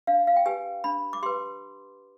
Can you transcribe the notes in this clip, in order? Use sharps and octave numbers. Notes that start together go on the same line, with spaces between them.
D4 F5
F5
G5
G4 B4 G#5
D4 B5
D6
G4 B4 C6